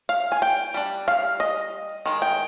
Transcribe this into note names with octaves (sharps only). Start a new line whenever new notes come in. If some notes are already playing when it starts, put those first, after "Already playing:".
F5
G#5
G5
G3 D4
F5
D#5
D#3 G#3
G5